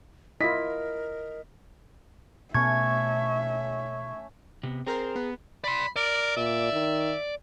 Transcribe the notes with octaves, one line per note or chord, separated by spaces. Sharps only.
E4 F4 A#4 D#5 B6
B2 A3 B3 C#4 E5 C#6 G#6
C3 B3
C4 G#4 A#4 C5 A#5
B3 B4
D5 B5 C6
A#4 D5
A#2 E5
D#3